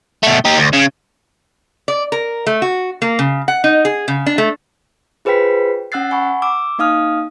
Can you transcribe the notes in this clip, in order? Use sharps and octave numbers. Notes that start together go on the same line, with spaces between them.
B2 A3
D#4 G4
D2
C#3
D5
A#4
A3
F#4
A#3
C#3
F#5
D#4
G#4
C#3
D4
A3
F4 G#4 B4 C5 G5 B6
C#4 F#5 E6 F#6 A6 C7
F#5 G#5 B5 C#6
D6 E6
A#3 D#4 F5 D#6 F6